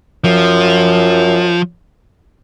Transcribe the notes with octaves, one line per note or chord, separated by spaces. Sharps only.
F#2 F3